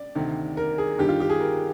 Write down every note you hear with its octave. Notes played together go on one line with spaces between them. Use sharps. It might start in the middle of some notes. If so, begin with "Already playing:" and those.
Already playing: D5
D2 C3 D#3
A#4
G#4
G1 G2 D#3 G4
F4
G4
G#4
A#4